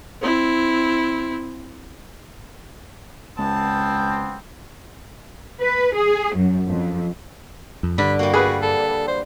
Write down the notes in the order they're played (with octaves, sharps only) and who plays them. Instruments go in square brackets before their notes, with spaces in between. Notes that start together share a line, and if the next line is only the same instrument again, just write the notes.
[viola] C4 E4
[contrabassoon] C#2 [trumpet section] B3 C4 [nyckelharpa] A5
[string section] B4
G#4
F#2
F2
[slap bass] F2
[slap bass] G2 [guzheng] D3 [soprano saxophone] B5
[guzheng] G3 A#3 [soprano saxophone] F#4
[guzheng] G3 [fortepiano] G#4 B4
[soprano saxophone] A4
C5